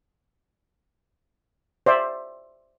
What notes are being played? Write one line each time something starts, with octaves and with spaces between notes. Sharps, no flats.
C5 D5 E5